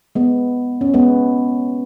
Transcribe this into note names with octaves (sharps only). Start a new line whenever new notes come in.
G#3 B3
C#4
G#3 B3